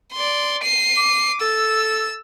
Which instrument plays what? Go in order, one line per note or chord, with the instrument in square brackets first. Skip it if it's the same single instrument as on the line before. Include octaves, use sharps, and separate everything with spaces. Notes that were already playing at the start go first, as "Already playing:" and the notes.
[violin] D5 C6
C7 D#7
[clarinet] D6
[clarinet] A4 [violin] E6